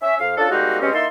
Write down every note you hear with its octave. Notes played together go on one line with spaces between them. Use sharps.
C#4 E5
F2 F5
C#4 D4 F4 A4
G3 G#3 A#3 C4 D#4 F#4
B2 G3 G#3 C4 C#4
A#3 D#4 E4 A4 C6